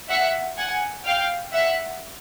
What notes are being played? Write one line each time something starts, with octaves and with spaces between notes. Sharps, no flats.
E5 F#5
F#5 G#5
F5 G5
E5 F#5